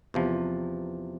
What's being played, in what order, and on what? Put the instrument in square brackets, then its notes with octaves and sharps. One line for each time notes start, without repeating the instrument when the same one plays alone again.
[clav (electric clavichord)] E2 C3 F3